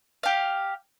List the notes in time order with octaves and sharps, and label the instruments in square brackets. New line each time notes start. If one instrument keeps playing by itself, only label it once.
[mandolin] G4 F5